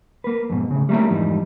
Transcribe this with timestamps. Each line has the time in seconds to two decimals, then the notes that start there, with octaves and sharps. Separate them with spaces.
0.24 A#3 B4
0.50 F2 G#2 B2
0.71 A2 C#3
0.89 G3 A3 A#3 C#4 E4
1.08 F2 G#2 E3 G3 D#4